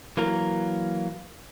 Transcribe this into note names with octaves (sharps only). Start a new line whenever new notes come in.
E3 F#3 A#3 A#4